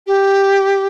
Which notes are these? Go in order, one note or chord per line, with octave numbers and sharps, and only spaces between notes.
G4